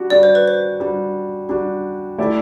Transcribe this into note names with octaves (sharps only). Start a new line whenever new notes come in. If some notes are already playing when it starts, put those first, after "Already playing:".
Already playing: G3 D4 F#4
G3 D4 F#4 D5
C5
B4
C5
G3 D4 F#4
G3 D4 F#4
A3 E4 G4 D5